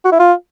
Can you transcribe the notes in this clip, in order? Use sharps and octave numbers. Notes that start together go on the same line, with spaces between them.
F#4
E4
F4